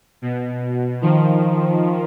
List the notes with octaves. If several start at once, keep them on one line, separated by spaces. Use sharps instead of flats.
B2
D#3 F3